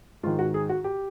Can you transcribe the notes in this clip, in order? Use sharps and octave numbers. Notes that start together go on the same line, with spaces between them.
G#2 D#3 F4
F#4
G#4
F#4
G4